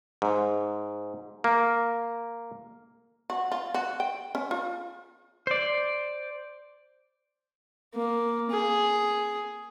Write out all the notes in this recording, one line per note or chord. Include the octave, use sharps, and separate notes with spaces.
G#2
A#3
F#4
F4
F#4
G5
C#4
F4
C5 D5
A#3
G#4